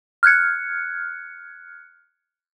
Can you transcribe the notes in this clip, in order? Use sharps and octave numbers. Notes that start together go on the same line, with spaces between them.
F6 F#6 G#6 C#7